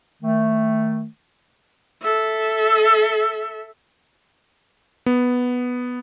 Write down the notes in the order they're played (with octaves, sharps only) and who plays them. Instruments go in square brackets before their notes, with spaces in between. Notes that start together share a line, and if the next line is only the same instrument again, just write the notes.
[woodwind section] D#3 A3
[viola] A4 E5
[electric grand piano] B3